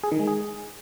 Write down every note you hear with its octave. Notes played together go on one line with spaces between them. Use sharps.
G#4
D#3
G#3
G#4